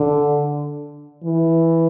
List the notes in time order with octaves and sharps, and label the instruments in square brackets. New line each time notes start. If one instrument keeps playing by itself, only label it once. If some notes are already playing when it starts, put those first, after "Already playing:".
Already playing: [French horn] D3
E3